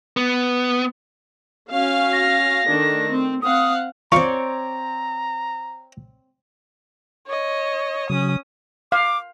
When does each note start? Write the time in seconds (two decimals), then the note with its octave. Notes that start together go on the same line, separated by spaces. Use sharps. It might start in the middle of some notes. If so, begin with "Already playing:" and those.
0.17 B3
1.70 C#4 F#4 F5
2.13 A#6
2.68 D#3 A3 D4
3.11 C4
3.42 C4 F5 F#5 D#6
4.12 C4 F4 C#5 D5 F5 A#5 C#6
7.27 C#5 D#5
8.10 C#3 F#3 C#4 D#6
8.92 F5 D6